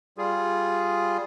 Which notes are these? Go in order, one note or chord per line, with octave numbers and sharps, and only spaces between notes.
G3 F4 G#4